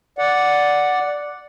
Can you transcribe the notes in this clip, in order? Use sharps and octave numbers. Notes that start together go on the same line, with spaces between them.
D5 F#5